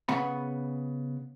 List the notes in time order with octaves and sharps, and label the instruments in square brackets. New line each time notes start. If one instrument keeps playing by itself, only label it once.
[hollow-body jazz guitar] C#3 B3 F#5 B5